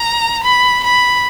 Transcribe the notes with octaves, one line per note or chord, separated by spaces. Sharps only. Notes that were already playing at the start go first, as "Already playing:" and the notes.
Already playing: A#5
B5
B5